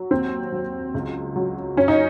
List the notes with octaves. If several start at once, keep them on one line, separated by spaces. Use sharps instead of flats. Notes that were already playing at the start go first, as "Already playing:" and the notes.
Already playing: F#3
D#2 C4
F#3
C#2
F#3
F#2 C#4
D#4